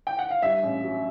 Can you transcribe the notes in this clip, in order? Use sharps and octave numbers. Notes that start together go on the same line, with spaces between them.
G5
F#5
F5
G2 E5
A1
F#3